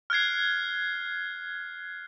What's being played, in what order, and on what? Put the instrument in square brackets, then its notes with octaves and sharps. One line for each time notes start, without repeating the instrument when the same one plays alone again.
[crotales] F6 F#6 G#6 C7